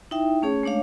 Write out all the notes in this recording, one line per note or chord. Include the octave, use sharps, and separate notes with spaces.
D#4 E4 E5 G5
A3 C#4 G#4 C#5
G#3 A3 D4 C#5 F5